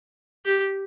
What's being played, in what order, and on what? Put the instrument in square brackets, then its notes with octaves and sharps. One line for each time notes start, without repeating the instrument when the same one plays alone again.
[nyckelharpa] G4